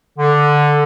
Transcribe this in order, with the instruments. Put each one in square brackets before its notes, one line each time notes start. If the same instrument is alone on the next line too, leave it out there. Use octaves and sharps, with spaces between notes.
[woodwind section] D3